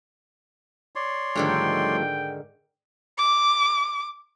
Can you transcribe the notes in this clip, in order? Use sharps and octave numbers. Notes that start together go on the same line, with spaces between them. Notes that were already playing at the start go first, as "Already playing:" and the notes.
C#5 D5 C6
G#2 D3 D#3 F3 G3 A3 G5
D6